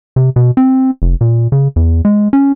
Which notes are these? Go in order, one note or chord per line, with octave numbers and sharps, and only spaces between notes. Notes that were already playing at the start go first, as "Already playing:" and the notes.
C3
B2
C4
F1
A#2
C#3
E2
G#3
C#4